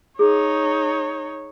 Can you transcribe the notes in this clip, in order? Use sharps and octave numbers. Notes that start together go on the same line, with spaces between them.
D#4 G#4 C#5